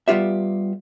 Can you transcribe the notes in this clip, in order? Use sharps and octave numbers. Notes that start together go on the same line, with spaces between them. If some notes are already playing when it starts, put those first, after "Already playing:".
G3 B3 F4 G4 E5